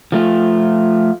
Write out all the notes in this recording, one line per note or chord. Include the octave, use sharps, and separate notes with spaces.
F3 A3 F4